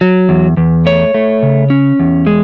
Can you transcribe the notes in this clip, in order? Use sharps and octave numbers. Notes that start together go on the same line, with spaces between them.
F#3
E2
E2
A3 C#5
A3
C#3
C#4
E2
G#3